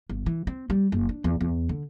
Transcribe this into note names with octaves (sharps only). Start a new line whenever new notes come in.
G1
E3
C4
G3
F#1
D4
E2
E2
D3